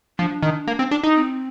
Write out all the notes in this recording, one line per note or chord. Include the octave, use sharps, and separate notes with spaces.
F3 D4
D#3
A#3
C4
D4
D#4
C4